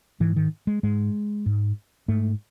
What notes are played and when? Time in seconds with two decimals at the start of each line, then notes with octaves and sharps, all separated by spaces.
0.20 G#2 E3
0.36 D#3
0.67 G#3
0.83 G#2 G#3
1.46 G#2
2.08 G#2 A3